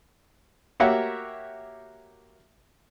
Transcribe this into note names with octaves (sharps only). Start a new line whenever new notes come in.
A#3 F#4 G4 C#5 E5 F#5